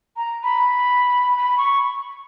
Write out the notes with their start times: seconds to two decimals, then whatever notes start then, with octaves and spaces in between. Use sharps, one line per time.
0.17 A#5
0.43 B5
1.38 B5
1.58 C#6